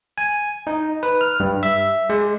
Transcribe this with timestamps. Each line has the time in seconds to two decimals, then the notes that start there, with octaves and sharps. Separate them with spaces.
0.18 G#5
0.67 D#4
1.03 B4
1.21 F6
1.40 G2
1.63 E5
2.10 G#3